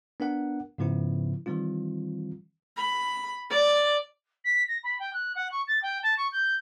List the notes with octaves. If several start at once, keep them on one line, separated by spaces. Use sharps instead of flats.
B3 D4 A#4 F#5
G#2 C#3 F3 B3 E4
D#3 E3 G3 C4 F4
B5
D5
B6
A#6
B5
G5
F#6
F#5
C#6
A6
G5
A5
C#6
G6